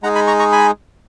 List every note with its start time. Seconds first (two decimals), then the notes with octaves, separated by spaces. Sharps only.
0.03 G#3 D#4 G#4 F#5 A#5
0.15 G#5 B5
0.27 A#5 C#6
0.39 A#5 C#6
0.52 G#5 B5